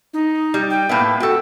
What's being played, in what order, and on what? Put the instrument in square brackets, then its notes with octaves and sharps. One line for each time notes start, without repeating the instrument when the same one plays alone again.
[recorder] D#4
[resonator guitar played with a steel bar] G3
[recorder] G5
[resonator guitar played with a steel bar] A2 A#3 B3
[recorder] F#4 [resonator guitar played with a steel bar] A4 G5